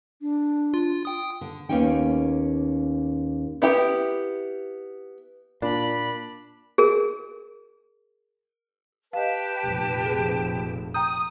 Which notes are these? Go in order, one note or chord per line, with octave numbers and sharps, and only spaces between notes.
D4
F4
G5 D#6
D3
D#2 A#3 B3 C#4 D#4 G5
B3 E4 G4
A#2 D4 B5
G#4 A#4
G4 B4 D#5 F5 A5
F1 F2 A#2
G#4
G5 A#5 D#6 G6